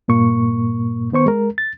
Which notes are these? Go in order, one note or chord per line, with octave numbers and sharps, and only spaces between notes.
G2 A#2 A#3 C#6
D#3 B3 C5 C#6
G#3 A#4
A6